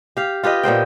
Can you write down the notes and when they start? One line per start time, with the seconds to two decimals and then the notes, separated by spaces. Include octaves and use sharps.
0.17 G4 F5
0.43 F4 G4 B4 D#5
0.63 A#2 B3 C5 G5